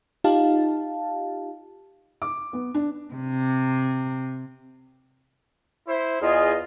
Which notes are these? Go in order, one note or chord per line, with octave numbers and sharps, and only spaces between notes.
D#4 F4 G4 F5 A5
D6
B3
D4
C3
E4 C5
E2 F4 G#4 D#5